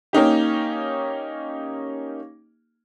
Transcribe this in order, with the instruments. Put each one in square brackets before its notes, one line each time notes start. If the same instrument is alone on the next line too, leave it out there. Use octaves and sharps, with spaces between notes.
[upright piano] A#3 C#4 D#4 G4